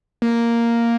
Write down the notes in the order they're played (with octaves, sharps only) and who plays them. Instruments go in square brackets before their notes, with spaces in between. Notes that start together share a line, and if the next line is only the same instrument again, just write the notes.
[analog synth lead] A#3